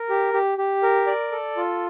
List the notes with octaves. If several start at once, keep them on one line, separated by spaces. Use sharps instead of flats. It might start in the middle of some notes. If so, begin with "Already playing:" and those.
Already playing: A#4
G4
G4
G4
A#4
D5
A4
F4